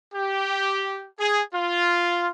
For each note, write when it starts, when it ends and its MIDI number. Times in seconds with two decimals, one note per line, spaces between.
0.15 1.05 67
1.20 1.41 68
1.54 2.31 65